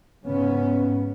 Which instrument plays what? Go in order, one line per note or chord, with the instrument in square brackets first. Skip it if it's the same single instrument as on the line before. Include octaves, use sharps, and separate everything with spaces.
[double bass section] G#2 C#3 B3 C#4